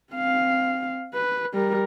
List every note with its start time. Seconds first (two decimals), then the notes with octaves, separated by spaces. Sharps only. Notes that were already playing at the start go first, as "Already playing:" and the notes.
0.14 C4 F5
1.14 B4
1.54 G3 A#4